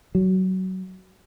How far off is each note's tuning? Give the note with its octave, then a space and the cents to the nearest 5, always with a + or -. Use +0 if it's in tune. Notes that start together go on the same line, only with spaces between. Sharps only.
F#3 +20